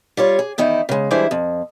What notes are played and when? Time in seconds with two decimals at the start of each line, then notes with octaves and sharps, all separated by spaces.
0.17 G3 F4 C#5
0.39 G#4
0.58 E2 D#3 D#4 E4
0.89 C#3 G#3
1.11 E3 G3 G#3 D4 E4 C5
1.31 F2